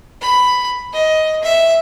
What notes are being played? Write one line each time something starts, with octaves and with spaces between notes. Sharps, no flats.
B5
D#5
E5